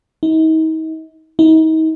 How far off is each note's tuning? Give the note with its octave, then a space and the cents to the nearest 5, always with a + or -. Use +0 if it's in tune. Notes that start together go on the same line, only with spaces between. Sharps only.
D#4 +40
D#4 +40